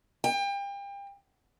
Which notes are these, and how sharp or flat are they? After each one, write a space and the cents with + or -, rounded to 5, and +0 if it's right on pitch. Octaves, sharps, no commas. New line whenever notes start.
G5 +35